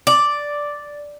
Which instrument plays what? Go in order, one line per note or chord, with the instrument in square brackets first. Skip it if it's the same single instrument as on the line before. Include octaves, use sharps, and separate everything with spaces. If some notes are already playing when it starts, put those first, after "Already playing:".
[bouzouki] D5